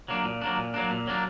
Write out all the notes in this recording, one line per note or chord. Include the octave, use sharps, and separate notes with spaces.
F#3 A#3 D4
A#2
F#3 A#3 D4
A#2
F#3 A#3 D4
A#2
F#3 A#3 D4